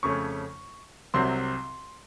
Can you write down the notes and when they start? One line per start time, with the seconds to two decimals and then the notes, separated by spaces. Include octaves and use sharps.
0.03 F2 C#3 A3 C#4 C#6
1.14 C2 C3 F#3 C4 C6